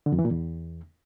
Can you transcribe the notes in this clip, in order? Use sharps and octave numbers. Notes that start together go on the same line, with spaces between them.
D3
F2
E3
A#2
E2